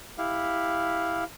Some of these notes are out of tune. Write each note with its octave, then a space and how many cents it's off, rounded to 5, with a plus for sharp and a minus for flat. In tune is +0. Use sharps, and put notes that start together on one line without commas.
E4 +0 G4 +10 F5 +0